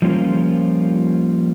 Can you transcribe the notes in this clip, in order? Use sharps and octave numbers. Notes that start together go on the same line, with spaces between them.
F3 G3 A#3 C#4 F4